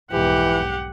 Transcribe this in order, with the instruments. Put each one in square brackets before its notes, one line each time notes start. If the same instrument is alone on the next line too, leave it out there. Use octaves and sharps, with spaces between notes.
[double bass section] B1 F2 G#2 [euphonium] E3 [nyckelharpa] G4 [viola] F#5